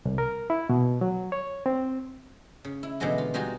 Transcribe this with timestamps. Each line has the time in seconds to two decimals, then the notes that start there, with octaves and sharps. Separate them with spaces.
0.05 C2
0.18 A#4
0.50 E4
0.69 B2
1.01 F#3
1.32 C#5
1.66 C4
2.64 C#3
2.83 E4
3.00 B2 D3 E3 F#3 G#3 F#4
3.18 F4
3.34 G3 G#3 D#4 F4 F#4 G#4